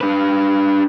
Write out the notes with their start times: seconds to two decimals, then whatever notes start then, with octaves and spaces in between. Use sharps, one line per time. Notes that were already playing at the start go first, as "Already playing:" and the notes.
0.01 D4 B4